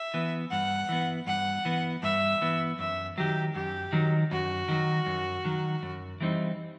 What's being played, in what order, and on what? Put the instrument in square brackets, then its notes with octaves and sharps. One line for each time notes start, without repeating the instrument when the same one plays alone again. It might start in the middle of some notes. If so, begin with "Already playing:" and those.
Already playing: [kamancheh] E5
[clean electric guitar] E3 B3
[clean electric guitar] G2 [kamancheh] F#5
[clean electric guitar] E3 B3
[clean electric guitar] G2 [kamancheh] F#5
[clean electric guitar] E3 B3
[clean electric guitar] G2 [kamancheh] E5
[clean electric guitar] E3 B3
[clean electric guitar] F#2 [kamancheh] E5
[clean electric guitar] D#3 F#3 [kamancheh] G4
[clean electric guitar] F#2 [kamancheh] G4
[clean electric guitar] D#3 F#3
[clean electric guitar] F#2 [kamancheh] F#4
[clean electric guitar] D#3 F#3
F#2
D#3 F#3
F#2
E3 G3 C4 D#4